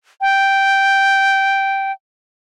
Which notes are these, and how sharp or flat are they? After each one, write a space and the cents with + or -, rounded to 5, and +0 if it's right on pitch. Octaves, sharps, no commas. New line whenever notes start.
G5 -5